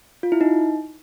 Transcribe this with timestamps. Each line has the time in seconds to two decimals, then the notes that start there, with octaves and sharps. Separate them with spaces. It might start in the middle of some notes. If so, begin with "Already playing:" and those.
0.23 F4
0.32 E4
0.41 D#4